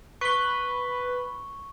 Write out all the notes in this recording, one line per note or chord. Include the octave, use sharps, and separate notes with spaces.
B4 C#6 G7